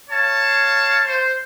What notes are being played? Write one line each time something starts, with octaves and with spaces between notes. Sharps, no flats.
C#5 F5 A5
C5